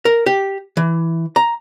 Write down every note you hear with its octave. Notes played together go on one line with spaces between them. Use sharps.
A#4
G4
E3
A#5